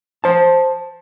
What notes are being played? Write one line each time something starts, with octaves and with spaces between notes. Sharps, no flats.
C5 A5